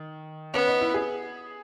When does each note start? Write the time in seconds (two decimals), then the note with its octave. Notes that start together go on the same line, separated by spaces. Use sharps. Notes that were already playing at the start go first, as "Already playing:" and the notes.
Already playing: D#3
0.54 B3 C#4
0.67 D#4
0.81 E4
0.94 G#4